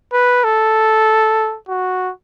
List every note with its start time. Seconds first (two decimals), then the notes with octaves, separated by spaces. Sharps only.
0.13 B4
0.44 A4
1.69 F#4